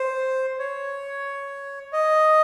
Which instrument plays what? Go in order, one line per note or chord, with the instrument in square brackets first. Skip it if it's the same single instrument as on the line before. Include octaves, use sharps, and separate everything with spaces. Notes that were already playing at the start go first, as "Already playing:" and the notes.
Already playing: [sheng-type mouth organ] C5
C#5
D#5